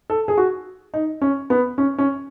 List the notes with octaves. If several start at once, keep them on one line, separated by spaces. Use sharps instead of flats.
A4
G#4
F#4
D#4
C#4
B3
C#4
C#4